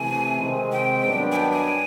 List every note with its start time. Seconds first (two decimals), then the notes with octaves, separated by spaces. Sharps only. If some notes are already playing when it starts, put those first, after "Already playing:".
Already playing: C3 E3 A3 G#5
0.40 C3 D#3 G#3 C4
0.72 G5
1.04 G2 D#3 F#3 B3 D4
1.32 G#5
1.36 G5
1.52 G#5